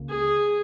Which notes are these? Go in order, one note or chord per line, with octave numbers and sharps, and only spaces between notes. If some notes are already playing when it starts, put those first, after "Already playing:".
Already playing: C#2 C#3 A#3
G#4